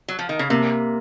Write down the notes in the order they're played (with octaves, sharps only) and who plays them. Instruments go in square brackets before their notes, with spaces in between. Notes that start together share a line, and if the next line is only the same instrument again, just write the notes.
[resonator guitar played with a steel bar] F#3
F3
D#3
C#3
[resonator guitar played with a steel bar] C3 [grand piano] A#3